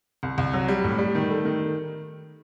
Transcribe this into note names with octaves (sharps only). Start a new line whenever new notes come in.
C2
C2
F#3
G3
A2
G3
D#3
A3
D#3